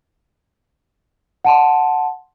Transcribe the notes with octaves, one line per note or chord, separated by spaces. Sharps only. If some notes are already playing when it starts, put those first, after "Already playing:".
F#5 A5 C6